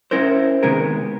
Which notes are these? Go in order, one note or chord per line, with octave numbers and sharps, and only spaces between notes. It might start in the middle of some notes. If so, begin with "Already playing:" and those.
C#4 E4 A#4 C5
C3 D#3 G#3 B3 G#4 A#4